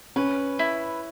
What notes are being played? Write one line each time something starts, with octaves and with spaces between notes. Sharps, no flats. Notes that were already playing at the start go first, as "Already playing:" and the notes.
C#4 B4
E4